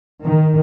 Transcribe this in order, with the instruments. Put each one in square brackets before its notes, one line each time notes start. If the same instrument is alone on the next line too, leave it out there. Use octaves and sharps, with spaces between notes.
[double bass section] D#3